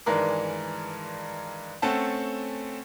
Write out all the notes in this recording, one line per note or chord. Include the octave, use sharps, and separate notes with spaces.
G2 D#3 E3 G#3 A#4 D5
A3 C4 C#4 A4 F#5 A5